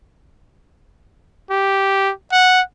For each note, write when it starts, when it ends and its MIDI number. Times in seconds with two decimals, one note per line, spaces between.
1.51 2.12 67
2.32 2.61 78